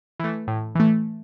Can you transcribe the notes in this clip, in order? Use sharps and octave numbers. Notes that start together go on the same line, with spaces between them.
E3 A3
A2
E3 A3